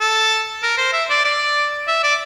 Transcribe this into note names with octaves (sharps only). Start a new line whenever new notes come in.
A4
A#4
C5
E5
D5
D5
E5
D5